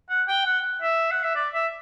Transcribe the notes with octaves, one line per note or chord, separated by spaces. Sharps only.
F#5
G5
F#5
E5
F#5
E5
D5
E5